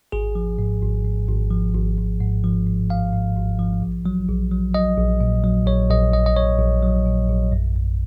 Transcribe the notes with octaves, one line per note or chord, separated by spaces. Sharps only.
G#1 G#4
F3
G#2
G#1
G#2
G#1
F3
G#1
G#1
G#2
F3
G#2
F3 F5
G#2
G#1
F3
A#1
F#3
A#1
F#3
F#3 D#5
A#1
A#2
F#3
A#1 C#5
A#1 D#5
A#1 D#5
D#5
A#1 C#5
A#1
F#3
A#2
A#1
F#2
F#2